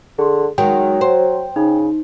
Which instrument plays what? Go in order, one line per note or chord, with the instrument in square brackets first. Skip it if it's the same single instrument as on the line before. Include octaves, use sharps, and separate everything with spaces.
[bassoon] D3 [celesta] G#4 C6
[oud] D#3 G#3 [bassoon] F#3 [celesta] F#5 [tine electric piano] G5
[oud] C5
[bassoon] C#3 [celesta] D#4